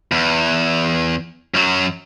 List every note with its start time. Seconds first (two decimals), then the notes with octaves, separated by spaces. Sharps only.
0.12 E2
1.54 F#2 F#3